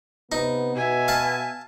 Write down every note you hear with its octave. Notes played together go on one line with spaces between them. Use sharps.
C3 B3 D#4
B2 E5 G#5
F5 A5